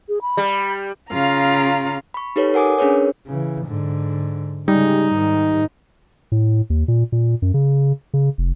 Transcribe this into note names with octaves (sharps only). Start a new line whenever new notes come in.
G#4
B5
G3
C#3 F4 F5 A#5
B5 C#6
D#4 G4 A4 B4 C#5
A#4 F#5 G#5 D6 D#6
C#4 D4 G#4 A#4 B4 C#5
C#3 E3
G#2 D3
C#3 G3 G#3 D#4
G#2 D#3
A2
D#2
A#2
A#2
F#2
C#3
C#3
F1